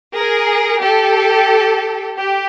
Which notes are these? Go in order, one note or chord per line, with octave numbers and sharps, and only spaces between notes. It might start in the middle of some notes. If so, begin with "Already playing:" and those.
G#4 A#4
G4 A4
G4